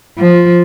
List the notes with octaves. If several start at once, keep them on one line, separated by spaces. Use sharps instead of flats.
F3